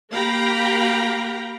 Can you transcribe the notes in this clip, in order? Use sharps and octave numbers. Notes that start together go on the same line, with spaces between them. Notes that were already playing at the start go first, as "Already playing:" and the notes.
A#3 G4 F5 G5 A#5 B5